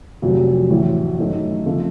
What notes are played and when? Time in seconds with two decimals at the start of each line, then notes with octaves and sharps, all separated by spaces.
0.22 F1 F2 C3 F#3
0.70 A1 A2 F#3
1.18 F#2 D#3 A3 D#4
1.66 C#3 F3 A3 C4